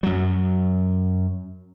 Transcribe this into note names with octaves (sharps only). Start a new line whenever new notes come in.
F#2 F#3